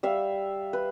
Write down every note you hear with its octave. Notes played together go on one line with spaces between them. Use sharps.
G3 E5 F5
B4